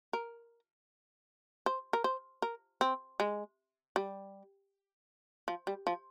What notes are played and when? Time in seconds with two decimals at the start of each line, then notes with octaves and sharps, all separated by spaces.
0.13 A#4
1.66 C5
1.93 A#4
2.04 C5
2.42 A#4
2.81 C4
3.20 G#3
3.96 G3
5.48 F3
5.67 G3
5.87 F3